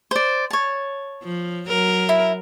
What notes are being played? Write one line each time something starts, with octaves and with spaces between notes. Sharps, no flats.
C5 D5
C#5 A5
F3
F#3 A#4
E4